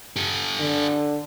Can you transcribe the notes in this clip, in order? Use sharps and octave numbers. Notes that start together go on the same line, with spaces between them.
G4 A4
D3